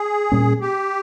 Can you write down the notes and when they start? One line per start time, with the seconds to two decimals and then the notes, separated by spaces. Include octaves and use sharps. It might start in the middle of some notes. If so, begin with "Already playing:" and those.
Already playing: G#4
0.32 A#2 G3 A#3 C#4
0.61 G4